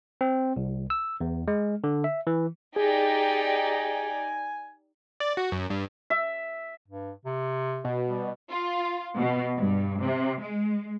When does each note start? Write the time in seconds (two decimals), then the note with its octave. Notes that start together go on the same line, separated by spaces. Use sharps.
0.21 C4
0.56 C2
0.90 E6
1.21 E2
1.48 G#3
1.84 D3
2.04 E5
2.27 E3
2.76 D#4 G4 G#4 D5 G5 G#5
5.20 D5
5.37 F#4
5.52 F#2
5.70 G2
6.10 E5
6.88 G2
7.25 C3
7.85 B2
8.08 G3
8.50 F4
9.16 B2
9.56 G2
10.00 C3
10.40 G#3